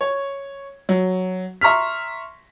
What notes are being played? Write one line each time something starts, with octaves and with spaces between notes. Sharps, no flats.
C#5
F#3
E5 A#5 C6 C#6 F6 B6